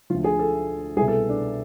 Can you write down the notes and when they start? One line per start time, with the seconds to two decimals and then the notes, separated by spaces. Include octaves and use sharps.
0.10 D2 D3 F3 F4
0.24 G#4
0.39 A4
0.97 C2 G#4
1.01 B2
1.08 A4
1.29 D4